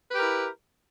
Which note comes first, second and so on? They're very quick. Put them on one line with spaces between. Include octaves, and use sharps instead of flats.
B4 G4 A#4 E4